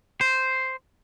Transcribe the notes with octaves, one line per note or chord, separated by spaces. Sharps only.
C5